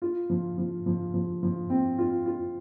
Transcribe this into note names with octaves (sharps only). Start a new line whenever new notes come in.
F4
F3
F3
F3
F3
F3
C4
F4
F4